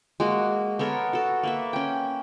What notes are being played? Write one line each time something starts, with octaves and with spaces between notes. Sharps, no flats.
G#3 A#3 F#4
B3 A4 A#4 C#5
F#4 A4
A#3 B4 E5
C#4 G5